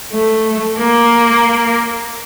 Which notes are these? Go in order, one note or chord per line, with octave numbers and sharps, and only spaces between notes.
A3
A#3